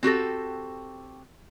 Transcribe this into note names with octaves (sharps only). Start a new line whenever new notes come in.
C4 F#4 G4 A4